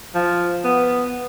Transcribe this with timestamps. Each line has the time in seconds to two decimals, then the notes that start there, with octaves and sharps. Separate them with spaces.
0.15 F3
0.64 B3